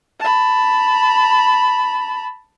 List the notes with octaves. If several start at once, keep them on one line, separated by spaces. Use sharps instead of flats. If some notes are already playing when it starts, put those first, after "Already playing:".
A5 B5